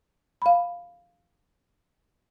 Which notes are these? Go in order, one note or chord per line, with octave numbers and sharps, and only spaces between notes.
F5 B5